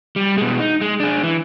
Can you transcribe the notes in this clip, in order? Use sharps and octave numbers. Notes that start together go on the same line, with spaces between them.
G3
B2 G#3
D#4
G#3
D4 G#4
E3